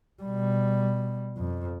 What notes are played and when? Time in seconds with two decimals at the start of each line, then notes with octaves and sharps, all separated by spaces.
0.23 B2 G3
1.37 F2